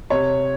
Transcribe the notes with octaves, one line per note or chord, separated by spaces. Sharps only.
C3 C#5